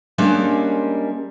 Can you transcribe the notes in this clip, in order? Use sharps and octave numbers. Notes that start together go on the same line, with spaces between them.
G3 G#3 A#3 C#4 D4